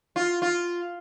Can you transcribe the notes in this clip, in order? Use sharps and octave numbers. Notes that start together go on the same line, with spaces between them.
F4
F4